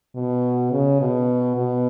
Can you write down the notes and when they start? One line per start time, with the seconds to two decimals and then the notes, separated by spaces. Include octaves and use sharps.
0.15 B2
0.72 C#3
1.01 B2
1.56 B2